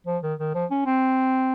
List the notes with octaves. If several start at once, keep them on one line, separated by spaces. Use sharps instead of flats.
F3
D#3
D#3
F3
C#4
C4